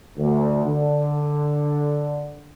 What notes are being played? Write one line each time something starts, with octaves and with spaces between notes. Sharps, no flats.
D2
D3